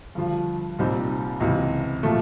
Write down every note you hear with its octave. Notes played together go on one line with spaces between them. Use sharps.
G2 D3 F3
C2 A#2 G3 C4 D#4
C#2 C3 E3
A#2 F3 A3